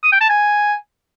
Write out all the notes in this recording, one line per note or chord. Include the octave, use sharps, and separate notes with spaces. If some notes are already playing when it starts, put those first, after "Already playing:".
D#6
G5
A5
G#5